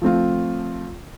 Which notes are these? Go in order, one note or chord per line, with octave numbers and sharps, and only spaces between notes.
F3 A3 C4 F4